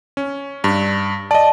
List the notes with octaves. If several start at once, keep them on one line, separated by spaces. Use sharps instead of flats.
C#4
G2
D5 D#5 A5